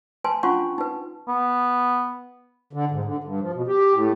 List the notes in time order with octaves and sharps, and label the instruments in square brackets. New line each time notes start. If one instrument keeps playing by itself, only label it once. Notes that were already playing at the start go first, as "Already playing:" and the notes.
[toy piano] B4 G#5 A5 C6
C#4 D4 F4 F#5 C6 C#6
D#4 B4
[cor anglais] B3
[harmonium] D3
G#2
D3
G2
F3
B2
G4
A2